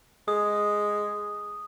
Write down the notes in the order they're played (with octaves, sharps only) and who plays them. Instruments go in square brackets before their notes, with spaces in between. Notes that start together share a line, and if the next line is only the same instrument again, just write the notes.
[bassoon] G#3 [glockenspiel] D#6